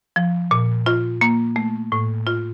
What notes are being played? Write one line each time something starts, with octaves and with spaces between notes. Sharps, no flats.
F3
A#2
F4
A#3
A3
A2
F4